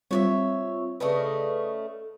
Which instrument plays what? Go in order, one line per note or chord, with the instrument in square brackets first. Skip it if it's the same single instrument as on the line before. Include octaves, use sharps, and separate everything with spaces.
[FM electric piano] G3 C4 F4 [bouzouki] C#5 D5 E5
[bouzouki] C#3 A3 D#5 [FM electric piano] B4 D5